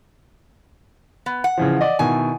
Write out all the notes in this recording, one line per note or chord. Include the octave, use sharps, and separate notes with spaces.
B3
F#5
C#3 E3 F3
D5 D#5
B2 D#3 E4 G#5